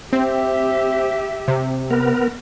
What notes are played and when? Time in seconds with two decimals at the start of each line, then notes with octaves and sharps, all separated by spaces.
0.13 C4 G4 E5
1.48 C3
1.91 B3 A#4